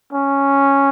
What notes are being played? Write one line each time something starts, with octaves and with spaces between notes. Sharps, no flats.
C#4